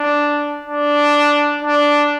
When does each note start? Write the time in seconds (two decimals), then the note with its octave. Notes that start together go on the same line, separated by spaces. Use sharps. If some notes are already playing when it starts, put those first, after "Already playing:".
Already playing: D4
0.65 D4
1.63 D4